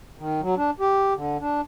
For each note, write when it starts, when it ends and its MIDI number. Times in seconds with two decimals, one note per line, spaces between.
0.18 0.41 51
0.41 0.55 54
0.57 0.71 62
0.80 1.14 67
1.15 1.37 50
1.39 1.61 62